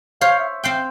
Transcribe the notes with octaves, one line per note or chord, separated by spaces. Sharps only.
C5 C#5 F5
E5
C4 F5 G5